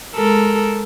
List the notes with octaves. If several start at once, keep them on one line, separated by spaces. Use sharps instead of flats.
G#3 A4 A#4